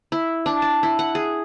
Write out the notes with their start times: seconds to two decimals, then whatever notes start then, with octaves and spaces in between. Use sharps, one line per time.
0.12 E4
0.46 D4
0.62 A5
0.83 E4
0.99 F#5
1.15 G#4